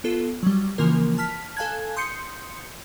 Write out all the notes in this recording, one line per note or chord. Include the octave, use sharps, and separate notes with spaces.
B3 F4 A4
F#3 G3
C#3 E3 F3 A#3 A#4
A5 F6 B6
A4 F5 G#5 A5 F#6 G#6
C6 D#6 G6 C7 C#7